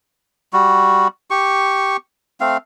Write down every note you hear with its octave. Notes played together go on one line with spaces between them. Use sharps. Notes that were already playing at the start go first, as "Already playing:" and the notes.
G3 F#4
G4 C#6
A3 C4 F5